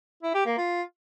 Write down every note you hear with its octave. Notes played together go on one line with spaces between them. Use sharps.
E4
G4
A#3
F4